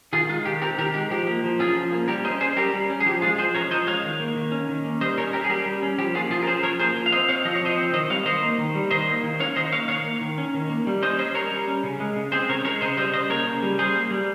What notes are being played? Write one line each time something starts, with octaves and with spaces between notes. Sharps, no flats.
D#3 F4 G#4
G#3 F4
D#3 G4
C4 G4 A#4
D#3 G4 A#4
G#3 G4
F3 G4
A#3
F3
C#4 F4 G#4
F3
A#3
G3 G4 A#4
C#4 C5 D#5
C#4 G#4 C5
G3 G4 A#4
G3
C#4
G#4
F3 G4
G#3 F4 G#4
F3 G#4 C5
C#4 A#4 C#5
F3 C5 D#5
G#3 C#5 F5
D#3
A#3
D#3
C#4
D#3
A#3
G3 C5 D#5
C#4 A#4 C#5
C#4 G4 A#4
G#4
G3 G4 A#4
G3
C#4
F3 G4
A#3 F4 G#4
F3 F4 G#4
A#4
C#4 G#4 C5
F3 A#4 C#5
A#3 G#4 C5
F3
F5
C4 C5 D#5
C4 C#5 F5
F3 D#5
C#5
F3 C5 D#5
C4
D#3 C5 D#5
G3 C#5 F5
D#3 C5 D#5
A#3
D#3
G3
D#3 C5 D#5
A#3
D#3
C#4 C#5 F5
D#3 C5 D#5
A#3 C#5 F5
D#3 C#5 F5
A#3
D#3
C#4
D#3
A#3
G3
C#4 C5 D#5
C#4 C5 D#5
G3 A#4 C#5
G3
C#4
C#3
G#3
C#3
C4 G#4 C5
C#3 A#4 C#5
G#3 A#4 C#5
C#3 C5 D#5
G3 C5 D#5
C#3 C5 D#5
A#3 A#4 C#5
C#3
G3
G3 G#4 C5
A#3
G3